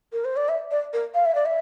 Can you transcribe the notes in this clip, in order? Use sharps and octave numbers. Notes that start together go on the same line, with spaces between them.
A#4
C5
D5
E5
D5
A#4
F5
E5
D5
E5